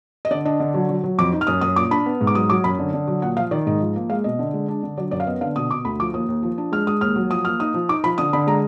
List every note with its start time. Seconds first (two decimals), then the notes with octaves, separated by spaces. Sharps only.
0.25 D#5
0.31 D3 D5
0.45 D4 D#5
0.60 D3
0.74 F#3
0.89 F#3
1.04 F#3
1.18 F2 D6
1.32 D#4
1.41 F6
1.47 F#2 D#6
1.61 F#2 D#6
1.76 A#2 D6
1.91 D4 B5
2.06 B3
2.21 G#2
2.27 D6
2.34 F#3 D#6
2.49 F#3 D6
2.64 F#2 B5
2.79 D3
2.93 D3
3.07 F#3
3.22 A#2 F#5
3.37 F3 F5
3.51 D#3 D5
3.66 G#2 D#5
3.80 F3
3.96 A#3
4.10 G#3 F5
4.24 B2 D#5
4.39 D3
4.54 G#3
4.68 D4
4.83 D3
4.97 F#3 D5
5.11 F#2 D5
5.20 F5
5.27 B3 D#5
5.41 D3 F5
5.56 B2 D#6
5.71 B2 D6
5.85 D2 B5
6.00 F3 D6
6.14 D#2 D#6
6.28 D#2
6.43 F3
6.58 D4
6.72 G#3 F6
6.87 G#3 D#6
7.01 D#2 F6
7.16 F#3
7.30 F3 D#6
7.45 A#3 F6
7.60 D#4 D#6
7.74 F3
7.89 D#4 D6
8.04 F3 B5
8.18 D3 D#6
8.33 D3 B5
8.47 G#3 A#5